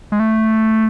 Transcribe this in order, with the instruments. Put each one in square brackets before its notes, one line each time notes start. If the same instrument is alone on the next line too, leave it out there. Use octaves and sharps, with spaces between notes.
[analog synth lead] G#3
A3